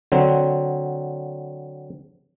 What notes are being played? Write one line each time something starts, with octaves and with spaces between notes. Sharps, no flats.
D3 F#3 C4